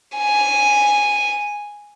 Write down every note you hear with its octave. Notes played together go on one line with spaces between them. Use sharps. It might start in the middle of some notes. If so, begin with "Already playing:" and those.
G#5